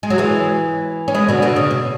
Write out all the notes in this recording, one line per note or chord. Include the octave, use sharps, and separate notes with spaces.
G#3
F#3
E3 G#3
C#4
G#3 B3
B2 D3
B2 D3
C#3
B2